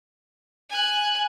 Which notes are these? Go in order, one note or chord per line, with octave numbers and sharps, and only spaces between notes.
G#5 F#6